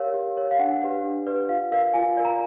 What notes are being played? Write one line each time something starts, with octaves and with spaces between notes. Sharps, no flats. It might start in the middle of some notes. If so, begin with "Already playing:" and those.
Already playing: G4 A#4 C#5 F5
G4
A#4 C#5
F5
D4 F#5
G4 B4 D5 F#5
D4
G4 B4 D5
F4 F5
A#4 D5 F5
F4 G#5
A#4 D5
A#5